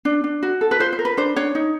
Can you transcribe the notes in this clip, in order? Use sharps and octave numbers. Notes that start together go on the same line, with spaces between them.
D4
D4
F#4
A4
B4
F4 C5
C5
A#4
B4
D4 C5
D4 C#5
D#4